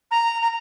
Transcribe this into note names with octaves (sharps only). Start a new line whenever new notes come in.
A#5
A#5